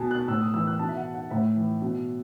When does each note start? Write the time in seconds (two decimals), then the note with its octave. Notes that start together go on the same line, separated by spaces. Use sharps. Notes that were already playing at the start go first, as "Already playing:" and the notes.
Already playing: B2 G#5 A5
0.11 F#6
0.28 A2 E6
0.40 D#6
0.54 E3 E6
0.67 F#6
0.79 B2 A5
0.89 E5
0.97 F#5
1.14 F#5
1.30 A2 E5
1.56 E3
1.82 B2